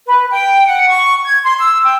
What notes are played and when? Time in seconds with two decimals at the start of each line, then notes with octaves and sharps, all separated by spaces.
0.07 B4
0.30 G5
0.67 F#5
0.89 C#6
1.26 G#6
1.43 C6
1.59 E6
1.84 G5